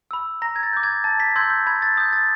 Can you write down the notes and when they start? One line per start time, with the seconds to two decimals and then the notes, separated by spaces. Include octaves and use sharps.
0.11 B5 E6
0.42 A#5 A#6
0.56 G#6
0.63 A6
0.73 D6 G6
0.83 G#6
1.04 A5 A6
1.20 B6
1.36 C6 E6 G6 G#6
1.50 G6
1.66 B5 G#6
1.82 A6
1.97 D#6 G6
2.13 A6